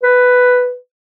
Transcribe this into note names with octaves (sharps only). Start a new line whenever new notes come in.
B4